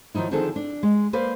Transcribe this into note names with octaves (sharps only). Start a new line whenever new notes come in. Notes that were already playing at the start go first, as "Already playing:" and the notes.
D#3 F3 F#3 D#4 E4
D3 D#3 F3 C4 G#4 A4
D4
G#3
A#3 B4 C5 D5 F5